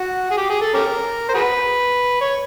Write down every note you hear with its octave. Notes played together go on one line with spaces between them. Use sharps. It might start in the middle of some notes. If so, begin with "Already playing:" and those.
Already playing: F#4
G#4
G4
G#4
A4
C#4 G4 A#4
C5
F#4 G#4 B4
C#5